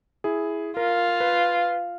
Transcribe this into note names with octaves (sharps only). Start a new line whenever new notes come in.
E4 G#4
F4 A#4
B4